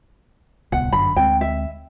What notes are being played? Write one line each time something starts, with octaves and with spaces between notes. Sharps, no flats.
D1 C2 B3 F#5
G1 F#2 D3 B5
D2 G#3 C4 G5
E5